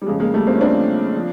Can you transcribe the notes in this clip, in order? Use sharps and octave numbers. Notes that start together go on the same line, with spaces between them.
G3
F2 C#3 F3 G#3
G#3 A#3
G3 A3
A#3 C4
C#4
C4 D4
F3